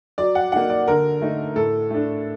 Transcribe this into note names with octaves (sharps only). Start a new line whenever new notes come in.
F#3 D5
F#5
A#3 D#4 F#5
D5
D3 A#4
A3 D#4
A2 A4
A3 D4